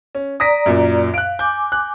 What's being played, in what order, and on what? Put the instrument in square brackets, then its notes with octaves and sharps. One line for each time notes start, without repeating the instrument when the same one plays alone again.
[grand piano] C#4
[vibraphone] D5 A#5 [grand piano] D#6 A#6 B6
[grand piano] F#2 A#2
[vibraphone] F5 [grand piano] F#6 D7
[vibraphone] G#5 D6 [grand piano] G6
[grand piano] F#6